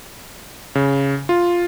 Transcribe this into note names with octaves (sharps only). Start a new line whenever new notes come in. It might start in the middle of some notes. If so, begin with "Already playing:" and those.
C#3
F4